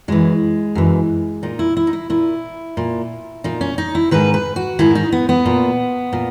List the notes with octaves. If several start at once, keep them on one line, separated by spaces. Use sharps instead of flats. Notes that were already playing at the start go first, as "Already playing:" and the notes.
F#2 E3 G#3
F#2 E3
A#2 D#4
E4
E4
D#4
E4
A#2 E4
A#2
A#2 D#4
C#4
D#4
E4
G#2 D#3 B4
B4
F#4
G#2 D#3 E4
D#4
B3
B3
A#2
A#2